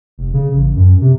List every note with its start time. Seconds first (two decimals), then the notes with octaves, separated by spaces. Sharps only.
0.18 F1
0.34 C#3
0.54 A1
0.76 F#2
1.01 C3